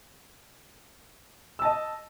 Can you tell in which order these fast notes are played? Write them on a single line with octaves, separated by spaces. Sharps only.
E6 A5 D#5